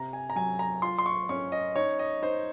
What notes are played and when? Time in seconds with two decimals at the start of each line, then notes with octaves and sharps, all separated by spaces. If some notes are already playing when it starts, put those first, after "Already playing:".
Already playing: C3 A#5
0.13 G#5
0.30 A#5
0.36 F#3 G#5
0.59 A#5
0.82 F4 C6
0.98 C6
1.06 C#6
1.29 C#4 C#6
1.52 D#5
1.76 D#4 C#5
1.99 D#5
2.22 D#4 C5